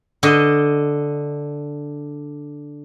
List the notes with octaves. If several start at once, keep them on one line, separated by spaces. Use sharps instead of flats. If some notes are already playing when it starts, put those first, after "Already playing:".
D3 D#5